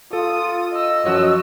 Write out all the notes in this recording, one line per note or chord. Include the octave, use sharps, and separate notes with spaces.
F4 A4 D#6
D#5 E6
F#2 F3 F#4 C#5